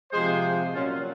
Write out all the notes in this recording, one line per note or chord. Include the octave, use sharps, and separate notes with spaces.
C3 F3 G#3 G#4 C5
A#2 F#3 C#4 F4